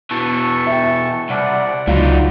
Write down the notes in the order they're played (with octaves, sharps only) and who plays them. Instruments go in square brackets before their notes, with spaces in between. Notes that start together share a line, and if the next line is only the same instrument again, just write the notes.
[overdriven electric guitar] B2 E3 [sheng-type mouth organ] A5 C#6
[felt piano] E5 G5
[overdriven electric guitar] C2 [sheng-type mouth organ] D5 F#5
[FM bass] C#2 [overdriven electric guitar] G2 D#4 [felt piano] F#3 F4